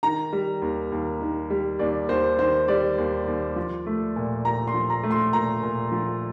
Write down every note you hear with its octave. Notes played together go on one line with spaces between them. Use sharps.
D#3 A#5
G3
D#2
D#2
D#3
G3
D#2 D5
D#2 C5
D#3 C5
G3 D5
D#2
D#2
F3
A3
A#2
A#2 A#5
C6
F3
A#5
A3
C6
A#2 A#5
A#2
F3